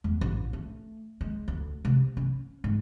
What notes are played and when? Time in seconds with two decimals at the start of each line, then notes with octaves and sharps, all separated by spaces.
0.04 E2
0.21 A1
0.53 A3
1.21 G#3
1.48 D2
1.85 C3
2.17 C#4
2.64 G#2